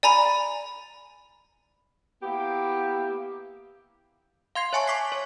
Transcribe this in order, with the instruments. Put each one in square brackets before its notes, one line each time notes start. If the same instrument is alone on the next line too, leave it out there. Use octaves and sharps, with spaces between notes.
[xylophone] D5 G#5 A#5 B5
[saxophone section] A#3 B3 E4 G4
[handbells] F5 C6 G#6 C7
C#5 E5 G#5 A5 C#6
C#6 D6 B6 C7
C#5